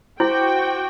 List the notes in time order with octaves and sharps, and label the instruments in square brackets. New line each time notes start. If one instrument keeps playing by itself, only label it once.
[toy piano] E4 [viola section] F#4 G5 [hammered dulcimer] G4 [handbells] C5